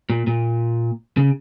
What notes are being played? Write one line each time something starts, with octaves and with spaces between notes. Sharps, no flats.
A#2
A#2
C#3